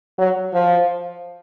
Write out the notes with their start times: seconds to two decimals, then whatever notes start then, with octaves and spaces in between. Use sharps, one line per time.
0.18 F#3
0.54 F3